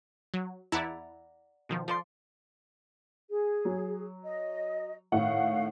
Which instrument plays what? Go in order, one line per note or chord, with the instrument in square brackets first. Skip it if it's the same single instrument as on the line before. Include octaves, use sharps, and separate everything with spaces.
[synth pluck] F#3
[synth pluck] E2 E4 A5 [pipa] D5 F#5 A#5
[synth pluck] B2 D#3 F3
[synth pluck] F3 [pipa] A4 D5 C6
[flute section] G#4
[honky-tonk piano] F#3
[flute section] D#5
[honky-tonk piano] G#1 A2 F#5 [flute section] F5